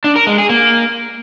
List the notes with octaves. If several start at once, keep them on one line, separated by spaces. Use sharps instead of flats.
D4
A#4
G#3
G#4
A#3